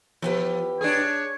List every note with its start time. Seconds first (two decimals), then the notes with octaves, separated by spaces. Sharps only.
0.22 E2 F3 G4 B4
0.81 D4 G#4 C#5